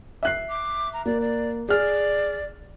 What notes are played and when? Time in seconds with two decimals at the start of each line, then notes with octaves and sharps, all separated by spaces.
0.23 E5 F#6 C7
0.49 D6
0.93 A#5
1.06 A#3 D5
1.21 D5
1.69 G#4 D5 F6